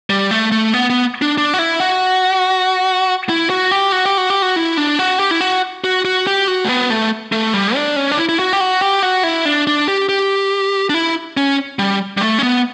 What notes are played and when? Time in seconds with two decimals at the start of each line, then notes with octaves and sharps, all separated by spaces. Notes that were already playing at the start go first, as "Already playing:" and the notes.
0.10 G3
0.31 A3
0.52 A3
0.74 B3
0.90 B3
1.22 D4
1.38 D4
1.54 F#4
1.59 E4
1.80 F#4
3.29 E4
3.50 F#4
3.71 G4
3.92 F#4
4.05 G4
4.18 F#4
4.30 G4
4.42 F#4
4.56 E4
4.77 D4
4.99 F#4
5.19 G4
5.31 E4
5.41 F#4
5.84 F#4
6.05 F#4
6.27 G4
6.48 F#4
6.64 A3
6.69 B3
6.90 A3
7.32 A3
7.54 G3
7.75 D4
7.96 C#4
8.12 D4
8.17 E4
8.29 E4
8.39 F#4
8.53 G4
8.60 F#4
8.81 G4
9.03 F#4
9.23 E4
9.45 D4
9.67 D4
9.88 G4
10.09 G4
10.90 D4
10.94 E4
11.37 C#4
11.79 G3
12.17 G3
12.21 A3
12.39 C#4
12.43 B3